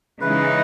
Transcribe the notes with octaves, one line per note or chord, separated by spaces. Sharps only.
C#3 E3 G#3 D#4 B4